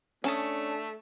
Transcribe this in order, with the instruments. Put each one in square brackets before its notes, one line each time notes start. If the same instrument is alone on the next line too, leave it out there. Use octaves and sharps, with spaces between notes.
[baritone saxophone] A3 [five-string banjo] C#4 [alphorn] D4 [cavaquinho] G#5 A5 D#6